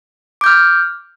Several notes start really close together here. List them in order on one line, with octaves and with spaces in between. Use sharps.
D6 G6 F6